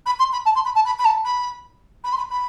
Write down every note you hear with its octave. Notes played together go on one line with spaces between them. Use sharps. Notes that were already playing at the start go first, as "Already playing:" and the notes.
B5
C6
B5
A5
C6
B5
A5
B5
B5
A5
B5
B5
C6
B5
B5